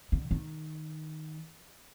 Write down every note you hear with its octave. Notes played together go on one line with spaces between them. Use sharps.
D3
D#3